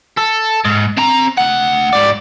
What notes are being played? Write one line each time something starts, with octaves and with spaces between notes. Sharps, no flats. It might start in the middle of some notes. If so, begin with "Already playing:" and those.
A4
G#2
C4 A#5
D2 F#5
G#2 D5